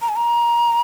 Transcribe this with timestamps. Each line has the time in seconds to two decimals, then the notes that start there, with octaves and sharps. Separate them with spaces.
0.02 A#5
0.09 G#5
0.16 A#5